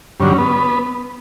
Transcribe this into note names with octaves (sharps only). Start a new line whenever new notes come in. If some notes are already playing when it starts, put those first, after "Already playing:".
G2 D3 F#3 C#4
B3